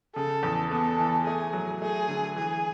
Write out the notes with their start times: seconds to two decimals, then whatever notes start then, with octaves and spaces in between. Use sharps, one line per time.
0.15 C#3 A4
0.43 E2
0.71 B3 A4
0.99 E3
1.26 A3 G#4
1.53 F#3
1.82 A3 G#4
2.09 D3
2.36 E3 G#4